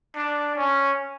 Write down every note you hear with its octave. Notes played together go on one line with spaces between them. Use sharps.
D4
C#4